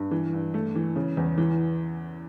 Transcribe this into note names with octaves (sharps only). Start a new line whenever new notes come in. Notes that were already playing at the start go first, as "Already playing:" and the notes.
Already playing: G2
E3
G2
A3
E3
C#3
E2
E3